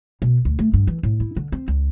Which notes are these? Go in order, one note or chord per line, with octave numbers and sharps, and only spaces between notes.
B2
D2
A3
G2
E3
A2
E4
D3
C4
C#2